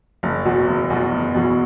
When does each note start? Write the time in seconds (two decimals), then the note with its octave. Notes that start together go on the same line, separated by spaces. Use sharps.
0.23 F#1
0.45 E2 B2 F#3
0.67 F#1
0.90 E2 B2 F#3
1.11 F#1
1.34 E2 B2 F#3